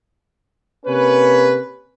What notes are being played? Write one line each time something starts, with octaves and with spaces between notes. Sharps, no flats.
C3 A#3 C#4 B4